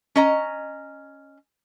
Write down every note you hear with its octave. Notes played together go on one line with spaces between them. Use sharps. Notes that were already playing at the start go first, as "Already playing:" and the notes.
C#4 D#5 A#5